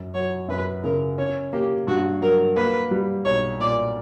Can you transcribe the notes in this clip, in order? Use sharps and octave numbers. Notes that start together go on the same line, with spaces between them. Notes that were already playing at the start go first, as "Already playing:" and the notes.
Already playing: F#2
F#3 C#5
F#2 B4
C#3 A#4
C#4 C#5
A#3 G4
G2 F#4
F#3 A#4
A#3 B4
G3
B1 C#5
A#2 D5